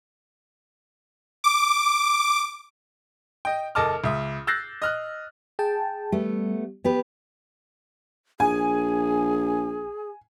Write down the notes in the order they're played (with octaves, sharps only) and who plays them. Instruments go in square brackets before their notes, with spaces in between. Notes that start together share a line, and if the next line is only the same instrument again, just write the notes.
[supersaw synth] D6
[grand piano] D#5 G5
F#1 A4 D#5 A5 D6 F6
C#2 E5 D#6
E6 F#6 G6 A6 A#6 C7
D#5 F6 F#6
[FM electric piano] G#4 G5 A5
[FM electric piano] G3 [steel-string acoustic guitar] A3 B3
[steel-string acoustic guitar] B3 G4 B4
[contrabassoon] A#1 [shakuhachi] G#4 [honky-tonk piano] G#5